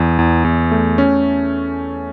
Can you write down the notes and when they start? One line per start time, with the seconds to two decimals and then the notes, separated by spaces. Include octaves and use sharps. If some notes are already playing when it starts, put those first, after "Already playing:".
Already playing: E2
0.19 E2
0.44 E2
0.71 A3
0.98 C#4